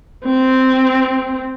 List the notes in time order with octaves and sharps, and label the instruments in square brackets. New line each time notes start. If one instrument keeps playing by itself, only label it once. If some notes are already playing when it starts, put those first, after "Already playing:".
[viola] C4